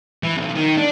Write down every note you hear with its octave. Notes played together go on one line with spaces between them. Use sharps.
E3
B1
D#3
D4